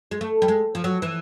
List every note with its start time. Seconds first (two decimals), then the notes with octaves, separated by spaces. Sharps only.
0.11 G#3
0.21 A3
0.42 G3
0.48 G#3
0.75 F3
0.84 F#3
1.02 E3